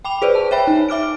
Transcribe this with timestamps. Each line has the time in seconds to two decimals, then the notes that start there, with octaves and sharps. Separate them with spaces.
0.05 G5 B5 D6 F7
0.22 G#4 B4 C5 D5
0.35 A5
0.51 C#5 E5 G5 B5
0.67 D#4
0.89 E5 D6 F6 D7